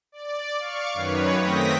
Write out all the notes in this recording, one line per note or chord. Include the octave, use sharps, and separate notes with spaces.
D5
F5 C#6 D6
F#2 D#3 B4 C#5
A3 C4 G5 D#6 A#6 B6